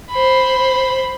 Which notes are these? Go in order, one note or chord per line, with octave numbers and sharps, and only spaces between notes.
C5 B5